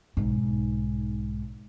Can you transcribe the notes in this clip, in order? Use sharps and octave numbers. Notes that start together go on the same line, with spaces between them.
B1 G#2